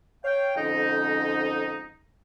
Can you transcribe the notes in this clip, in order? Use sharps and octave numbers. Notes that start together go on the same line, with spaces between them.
C#5 F5 G5
F2 G#2 D3 C#4 D#4